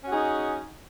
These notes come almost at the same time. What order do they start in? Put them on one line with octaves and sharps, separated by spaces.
C#4 F#4 G#4 D#4